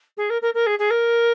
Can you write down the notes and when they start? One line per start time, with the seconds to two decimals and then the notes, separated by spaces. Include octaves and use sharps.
0.17 G#4
0.30 A#4
0.42 A#4
0.54 A#4
0.66 G#4
0.79 G#4
0.90 A#4